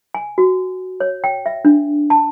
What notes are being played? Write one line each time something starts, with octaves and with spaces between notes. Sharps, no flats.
G#5
F#4
C#5
G5
E5
D4
A5